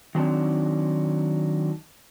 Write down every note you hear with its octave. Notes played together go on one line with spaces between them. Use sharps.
D#3 F#3 C4 D4 D#4